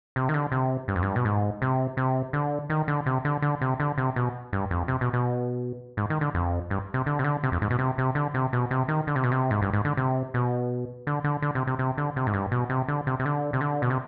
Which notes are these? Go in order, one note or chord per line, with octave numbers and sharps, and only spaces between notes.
C3
D#3
D3
C3
G2
F2
G2
B2
G#2
C3
C3
D3
D#3
D3
C3
D3
D3
C3
D3
C3
B2
G2
F2
C3
B2
B2
G#2
D#3
D3
F2
G2
C3
D3
C3
D3
C3
F2
G#2
B2
C3
C3
D3
C3
B2
C3
D#3
D3
C3
B2
C3
G#2
G2
G#2
D3
C3
B2
D3
D3
D3
C3
C3
C3
D3
C3
G#2
G2
B2
C3
D3
C3
C3
D3
C3
D3
B2
C3